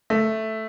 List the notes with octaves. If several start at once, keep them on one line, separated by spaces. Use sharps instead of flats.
A3